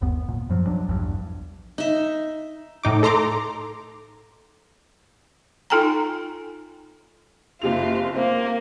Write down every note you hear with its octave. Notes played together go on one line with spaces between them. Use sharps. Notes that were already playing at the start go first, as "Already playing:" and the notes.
G1 D#2 B3
A#2
F#2 F3 F#3
B1 F#3 D4
A#1 E2 G2
D#4 E5
A2 D#4 D6
A4 A#5 C6 D6
D#4 F4 A4 G5 G#5 A#5
F#1 C3 F4 F7
A#3 C4